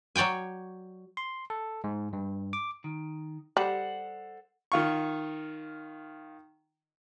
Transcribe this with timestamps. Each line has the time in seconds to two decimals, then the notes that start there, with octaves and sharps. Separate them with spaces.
0.16 F#3 C#5 D5 G5 G#5
1.17 C6
1.50 A4
1.84 G#2
2.13 G2
2.53 D6
2.84 D#3
3.57 G3 A4 C5 F#5
4.72 D#3 F4 C#6